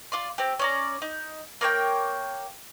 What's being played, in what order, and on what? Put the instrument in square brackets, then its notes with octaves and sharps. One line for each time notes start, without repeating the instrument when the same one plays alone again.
[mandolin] F4 D5 C6
C4 G4
C#4 D5 A#5
D#4
A#3 A#4 C#5 G5